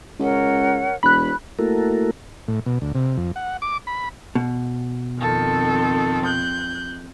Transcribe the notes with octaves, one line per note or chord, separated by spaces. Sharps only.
C#2 A#4 C#5 F#5
E1 B5 F#6
A3 A#3 E4 F#4 A4 A#4
A2
B2
D2
C3
F2
F#5
D6
B5
B2
F2 D#3 C4 A4
F#6 G6